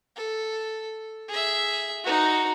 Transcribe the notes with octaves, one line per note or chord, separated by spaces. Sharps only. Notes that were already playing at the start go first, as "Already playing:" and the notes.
A4
G#4 E5
D#4 F#4